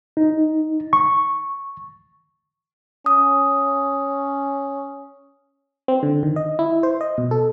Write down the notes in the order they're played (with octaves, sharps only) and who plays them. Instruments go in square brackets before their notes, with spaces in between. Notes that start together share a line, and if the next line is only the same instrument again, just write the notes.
[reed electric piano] D#4
C#6
[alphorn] C#4 [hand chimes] D#6
[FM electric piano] C4
D3
D#3
D#5
E4
C5
D#5
B2
A4